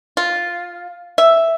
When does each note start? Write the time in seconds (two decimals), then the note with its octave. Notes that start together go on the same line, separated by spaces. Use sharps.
0.17 F4
1.18 E5